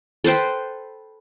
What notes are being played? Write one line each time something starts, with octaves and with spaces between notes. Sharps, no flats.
A4 B4 C5 G5